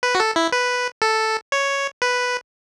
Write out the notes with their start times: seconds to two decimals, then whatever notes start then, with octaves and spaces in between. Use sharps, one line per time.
0.03 B4
0.15 F#4
0.20 A4
0.36 E4
0.52 B4
1.02 A4
1.52 C#5
2.02 B4